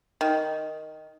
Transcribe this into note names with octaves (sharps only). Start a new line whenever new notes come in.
D#3